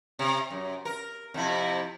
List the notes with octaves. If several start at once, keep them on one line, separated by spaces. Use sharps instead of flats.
C3
F#2
A#4
F2 C3 E4